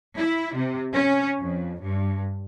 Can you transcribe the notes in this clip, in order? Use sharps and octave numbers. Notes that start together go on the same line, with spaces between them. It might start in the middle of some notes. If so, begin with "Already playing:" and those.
E4
C3
C#4
F2
G2